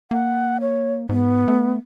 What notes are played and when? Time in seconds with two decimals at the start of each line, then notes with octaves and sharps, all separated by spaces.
0.11 A#3 F#5
0.61 C#5
1.09 G#2 B3
1.48 A3